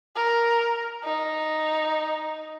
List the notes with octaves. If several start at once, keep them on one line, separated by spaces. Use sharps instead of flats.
A#4
D#4